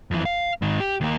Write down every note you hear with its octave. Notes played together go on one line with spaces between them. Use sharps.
F2 E3
F5
G#2 D#3
G4
D#2 A#3